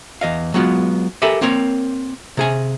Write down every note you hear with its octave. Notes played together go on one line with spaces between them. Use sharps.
E2 D#5 F5
F#3 G#3 B3 F4
G4 A4 A#4 E5 G#5 B5
A#3 C4 A#4 C#5
C3 G#4 G#5